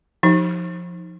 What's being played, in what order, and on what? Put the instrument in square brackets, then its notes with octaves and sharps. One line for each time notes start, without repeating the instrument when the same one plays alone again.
[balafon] F3 D#4